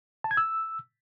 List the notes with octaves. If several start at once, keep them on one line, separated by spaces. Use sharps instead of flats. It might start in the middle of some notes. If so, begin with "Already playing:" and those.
A5
G#6
E6